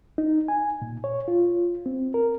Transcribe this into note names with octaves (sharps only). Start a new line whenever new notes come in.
D#4
G#5
A#2
C#5
F4
C4
A#4